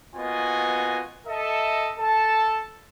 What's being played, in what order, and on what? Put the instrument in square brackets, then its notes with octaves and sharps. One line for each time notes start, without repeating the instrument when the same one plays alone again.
[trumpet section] A#3 B3 F4 F#4 D#5 G#5
A4 D#5 E5
A4 A5